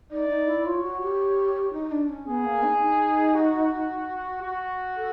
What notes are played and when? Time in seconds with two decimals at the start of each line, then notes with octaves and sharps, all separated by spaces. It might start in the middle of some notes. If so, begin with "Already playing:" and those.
0.11 D#4 D5
0.29 D#4
0.47 E4
0.65 F4 C#5
0.83 F#4
1.01 G4
1.73 D#4
1.91 D4
2.09 C#4
2.27 B3 G#4
2.45 A#3
2.63 D#4
2.81 D#4
3.35 F#4
4.42 F#4
4.97 A4